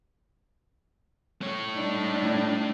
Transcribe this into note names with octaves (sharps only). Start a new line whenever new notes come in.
A3 C#5
G3 D4 D#4
A2